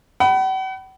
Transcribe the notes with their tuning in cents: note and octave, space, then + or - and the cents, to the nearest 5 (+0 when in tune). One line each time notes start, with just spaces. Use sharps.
F#5 +45 B5 +0